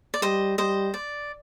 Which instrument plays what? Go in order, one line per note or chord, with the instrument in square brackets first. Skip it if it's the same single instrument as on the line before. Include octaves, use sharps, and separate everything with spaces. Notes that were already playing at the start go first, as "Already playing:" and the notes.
[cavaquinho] D5
[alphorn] G3 [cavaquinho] C5 D#5
[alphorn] G3 [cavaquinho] C5 D#5
[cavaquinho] D5